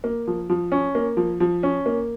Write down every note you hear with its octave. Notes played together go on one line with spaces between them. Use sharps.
A#3
F3
F3
C#4
A#3
F3
F3
C#4
A#3